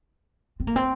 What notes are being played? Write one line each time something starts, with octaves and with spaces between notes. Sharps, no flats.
C4
A#3
C4